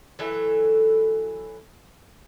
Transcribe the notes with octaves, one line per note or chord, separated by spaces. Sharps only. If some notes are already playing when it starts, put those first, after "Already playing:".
E3 F#3 A4 E5